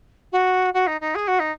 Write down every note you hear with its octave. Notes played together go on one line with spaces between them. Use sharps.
F#4
F#4
D#4
D#4
G#4
F#4
D#4